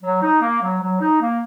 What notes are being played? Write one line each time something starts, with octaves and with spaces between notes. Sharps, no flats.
F#3
D#4
A#3
F#3
F#3
D#4
A#3